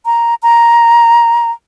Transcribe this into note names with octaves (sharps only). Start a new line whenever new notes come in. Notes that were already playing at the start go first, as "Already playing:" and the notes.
A#5
A#5